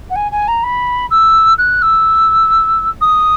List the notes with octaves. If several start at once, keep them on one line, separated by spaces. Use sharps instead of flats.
F#5
G#5
G#5
A#5
B5
E6
F#6
E6
D#6